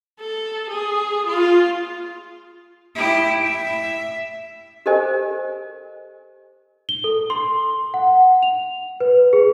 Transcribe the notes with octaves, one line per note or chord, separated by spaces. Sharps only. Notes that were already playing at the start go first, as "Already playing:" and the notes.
A4
G#4
F4
E4 G4
E5
G4 A4 A#4 C5 D#5 G#5
G7
A4
C6
F#5
F7
B4
G#4